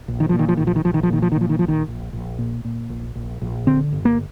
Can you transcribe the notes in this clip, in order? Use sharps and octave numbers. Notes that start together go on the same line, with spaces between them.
A#1
D#3
A#2 F3
D#3
F3
A#1 D#3
F3
D#3
A#1 F3
D#3
F3
A#2 D#3
F3
D#3
A#2
F3
D#3
A#1 F3
D#3
A#1
A#1
A#2
A#2
A#1
A#1
A#1
D3 C4
G1
A#3